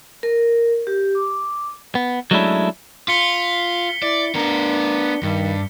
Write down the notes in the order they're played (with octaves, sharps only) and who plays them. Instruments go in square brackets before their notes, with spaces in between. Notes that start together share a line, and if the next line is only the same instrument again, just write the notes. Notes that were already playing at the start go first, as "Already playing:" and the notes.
[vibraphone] A#4
G4
D6
[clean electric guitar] B3
F#3 G#3 A3 C#4 D4 E4
[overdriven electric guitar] F4 [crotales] B6 C#7 G7
[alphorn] E4 [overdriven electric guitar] D5
[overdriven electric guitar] B3 A#4 [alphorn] D4
[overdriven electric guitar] G2 [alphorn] D#3